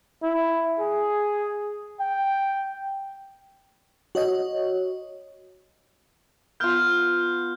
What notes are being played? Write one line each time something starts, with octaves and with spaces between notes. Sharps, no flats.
E4
G#4
G5
F#4 C#5 D#5
B3 F4 F6 G6